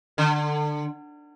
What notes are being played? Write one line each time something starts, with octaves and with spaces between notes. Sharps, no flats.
D3